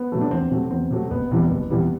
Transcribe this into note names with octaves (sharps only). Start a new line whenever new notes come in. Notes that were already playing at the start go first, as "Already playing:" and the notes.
Already playing: B3
C3 F#3 A3
D4
E2 C4
C3 F#3 A3
E2 C4
C3 F#3 A3
F#1 B3
E2 C3 E3 G3
F#1
E2 C3 E3 G3